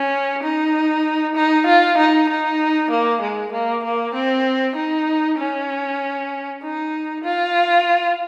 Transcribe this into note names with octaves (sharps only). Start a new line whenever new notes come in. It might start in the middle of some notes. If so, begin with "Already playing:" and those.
Already playing: C#4
D#4
D#4
F4
D#4
D#4
A#3
G#3
A#3
A#3
C4
D#4
C#4
D#4
F4